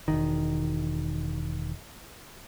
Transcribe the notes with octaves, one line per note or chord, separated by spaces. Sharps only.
E1 C2 D#3